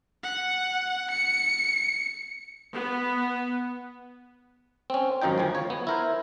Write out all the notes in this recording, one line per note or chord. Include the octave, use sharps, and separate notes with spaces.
F#5
C#7
B3
C4 C#4
G#1 F#2 F3 D#4 G5
D2 C#3 F3 G#5
C#5
B3
E4 A#4 C5